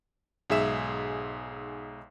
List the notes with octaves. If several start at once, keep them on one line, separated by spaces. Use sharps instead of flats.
B1 G#2 G#4 E5 E7